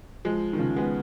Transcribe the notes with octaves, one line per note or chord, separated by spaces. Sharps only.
F3 G#3
D#3
C#3 F3
G#3 B3